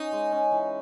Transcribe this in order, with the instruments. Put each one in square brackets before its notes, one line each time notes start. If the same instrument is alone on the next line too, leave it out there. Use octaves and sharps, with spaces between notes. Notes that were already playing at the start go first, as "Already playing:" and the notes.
Already playing: [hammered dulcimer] C#4 [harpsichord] D#4
[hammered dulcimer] G#3
C#4
E3